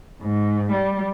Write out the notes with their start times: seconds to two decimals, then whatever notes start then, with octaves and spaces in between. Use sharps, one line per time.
0.21 G#2
0.70 G3